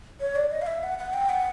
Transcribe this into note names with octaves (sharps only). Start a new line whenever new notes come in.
C#5
D5
D#5
F5
E5
F#5
F#5
G5
F#5